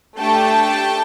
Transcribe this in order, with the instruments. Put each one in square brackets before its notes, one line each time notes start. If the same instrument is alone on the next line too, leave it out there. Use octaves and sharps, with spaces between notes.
[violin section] A3 D4 G4 G5 A5